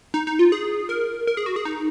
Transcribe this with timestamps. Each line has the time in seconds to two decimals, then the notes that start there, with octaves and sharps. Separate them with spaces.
0.14 D#4
0.27 D#4
0.39 F4
0.52 G#4
0.89 A#4
1.27 A#4
1.37 G#4
1.46 F#4
1.56 G#4
1.65 D#4